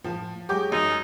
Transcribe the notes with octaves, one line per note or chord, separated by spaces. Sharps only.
A2 F3 A5
F#3 G#3 G4 G5 D6
F#2 D#4